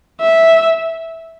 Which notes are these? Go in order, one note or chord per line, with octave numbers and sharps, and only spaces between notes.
E5